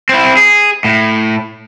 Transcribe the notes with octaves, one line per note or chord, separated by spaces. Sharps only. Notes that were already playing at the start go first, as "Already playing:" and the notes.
C4 E4
G#4
A2